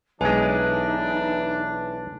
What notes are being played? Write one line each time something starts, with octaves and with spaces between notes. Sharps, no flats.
B1 E3 G#3 D4 D#4 B4 G#5